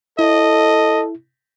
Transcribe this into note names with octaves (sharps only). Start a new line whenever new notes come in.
E4 A4 D#5